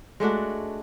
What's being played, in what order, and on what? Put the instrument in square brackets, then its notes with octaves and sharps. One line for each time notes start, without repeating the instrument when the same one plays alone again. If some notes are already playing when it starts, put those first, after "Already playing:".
[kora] G#3 A3 D4 F#4